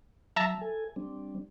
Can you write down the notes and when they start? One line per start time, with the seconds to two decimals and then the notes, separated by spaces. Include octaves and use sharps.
0.36 F#3 E5 A5 A#5
0.61 A4 G#5
0.96 G3 C4 D4